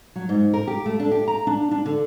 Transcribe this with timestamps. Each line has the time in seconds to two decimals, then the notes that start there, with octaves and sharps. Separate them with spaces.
0.16 F#3
0.29 G#2
0.54 A#4
0.67 G4
0.86 A3
1.00 D4
1.11 G4
1.28 A#5
1.47 D4
1.71 D4
1.86 D3